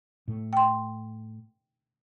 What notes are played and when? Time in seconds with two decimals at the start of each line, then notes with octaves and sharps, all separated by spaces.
0.28 A2 A3
0.53 G5 C6